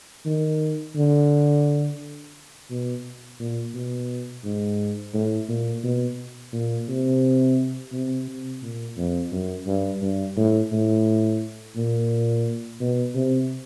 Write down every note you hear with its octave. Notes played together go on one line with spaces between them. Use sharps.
D#3
D3
B2
A#2
B2
G#2
A2
A#2
B2
A#2
C3
C3
C3
A#2
F2
F#2
G2
G2
A2
A2
A#2
B2
C3